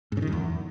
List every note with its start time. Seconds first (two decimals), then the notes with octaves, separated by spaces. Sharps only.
0.12 G#2
0.17 C#3
0.22 D#3
0.27 F#2
0.32 E2